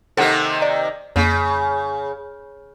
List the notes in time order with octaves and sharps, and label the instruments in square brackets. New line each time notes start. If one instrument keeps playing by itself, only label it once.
[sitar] C3 D#3 A#3 [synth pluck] A4 F#5
[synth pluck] D5
[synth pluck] F2 A#3 [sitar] C#3